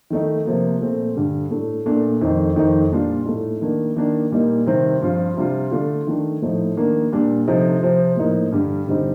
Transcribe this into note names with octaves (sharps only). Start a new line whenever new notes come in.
D#3 A3 D#4
C3 F3 A#3
A#2 A3 C4
G2 D3 G3
A2 A3 D4
A#2 A3 D4
F2 D#3 A3 D#4
F2 D#3 A3 C4 D#4
A#2 G3 D4 F4
A2 A3 D#4
D#3 A#3 D4
D#3 A#3 D4
A#2 G3 A#3 D#4
C3 D#3 G3 C4
G2 F3 C4 F4
C3 G3 D4 F4
D3 A3 D4 F4
D#3 A3 D4
A2 F3 A3 D#4
D#3 A#3 D4
A#2 G3 D4
C3 F3 A3 D#4
C3 F3 C4 F4
A2 F3 A#3 D#4
G2 D3 G3
G2 D3 G3 C4 D#4